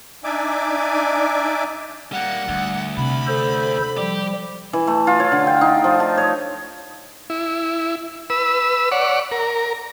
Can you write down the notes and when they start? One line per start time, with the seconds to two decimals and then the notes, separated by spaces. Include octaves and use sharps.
0.24 D4 D#4 D5 E5 G#5 D6
2.12 G3 A#3 F#5
2.48 D2 G3
2.97 C3 B5
3.27 A4 C5
3.97 F3 G3 G4
4.73 E3
4.87 A3
5.07 F4
5.20 C#5
5.32 D3
5.47 G5
5.61 D#4
5.84 F3
6.00 A5
6.17 C#5
7.30 E4
8.30 B4 E6
8.92 C#5 D5 F#5
9.32 A#4